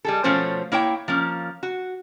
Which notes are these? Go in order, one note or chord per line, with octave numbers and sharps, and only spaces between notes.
G3 G#4 A4
B2 F3 A3 C#4 C5 C#5
A#3 E4 C#5 G5
F3 A#3 C#4
F#4